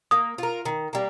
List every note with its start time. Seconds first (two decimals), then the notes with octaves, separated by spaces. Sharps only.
0.11 A#3 D#6
0.38 F4 A#4
0.66 D#3
0.93 G3 A#3